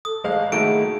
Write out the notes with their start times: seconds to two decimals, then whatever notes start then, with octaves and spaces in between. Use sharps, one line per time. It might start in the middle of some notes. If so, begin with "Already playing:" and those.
0.05 A4 D#6
0.24 G#1 G#3 F5
0.52 D#3 A3 A#3 E4 F#4 G#4 A4 D7